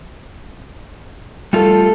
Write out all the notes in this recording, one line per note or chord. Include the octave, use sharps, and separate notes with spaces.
G3 A3 F4 A4